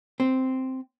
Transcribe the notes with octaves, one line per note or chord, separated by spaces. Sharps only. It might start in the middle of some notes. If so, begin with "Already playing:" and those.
C4